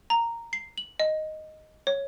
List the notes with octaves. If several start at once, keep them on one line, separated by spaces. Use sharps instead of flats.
A#5
C7
F#7
D#5
C#5